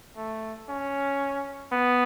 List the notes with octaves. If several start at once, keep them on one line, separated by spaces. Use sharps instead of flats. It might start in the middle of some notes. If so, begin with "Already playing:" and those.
A3
C#4
B3